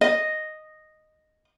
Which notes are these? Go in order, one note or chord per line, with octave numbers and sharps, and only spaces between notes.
D#5